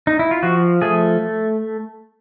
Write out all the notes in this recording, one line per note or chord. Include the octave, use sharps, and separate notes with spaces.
D#4
E4
F4
F3 F#4
A3 G#4